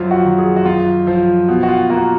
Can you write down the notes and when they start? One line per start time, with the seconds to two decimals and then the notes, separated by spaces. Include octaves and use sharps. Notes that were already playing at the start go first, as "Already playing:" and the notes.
Already playing: F#2 F3 F4
0.11 F#4
0.24 D#3
0.38 G#4
0.56 F#4
0.65 F#2 F4
1.07 F3 F4
1.48 B2
1.63 F#4
1.68 F4
1.90 A#3 F#4